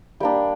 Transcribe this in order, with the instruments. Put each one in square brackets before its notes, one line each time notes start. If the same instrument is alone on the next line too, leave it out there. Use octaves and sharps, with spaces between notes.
[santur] G3 A#3 D4 G5